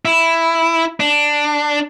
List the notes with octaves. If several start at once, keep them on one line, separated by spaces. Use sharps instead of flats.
E4
D4